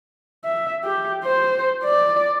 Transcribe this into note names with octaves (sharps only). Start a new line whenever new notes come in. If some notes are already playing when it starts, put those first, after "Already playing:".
E5
G4
C5
D5